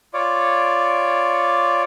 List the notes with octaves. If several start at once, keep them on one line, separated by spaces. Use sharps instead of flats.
F4 C#5 D5